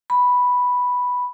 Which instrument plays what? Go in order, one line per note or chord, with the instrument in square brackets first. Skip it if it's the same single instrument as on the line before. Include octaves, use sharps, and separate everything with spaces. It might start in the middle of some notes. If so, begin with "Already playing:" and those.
[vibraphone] B5